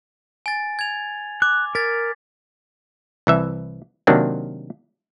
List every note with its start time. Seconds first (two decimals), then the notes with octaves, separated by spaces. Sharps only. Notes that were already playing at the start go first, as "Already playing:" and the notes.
0.46 G#5 A6
0.79 G#6 F7
1.42 D6 F#6
1.75 A#4 G#6 A6 B6
3.27 C2 E3 E5
4.07 C3 D#3 F#3 A#3 C4 D4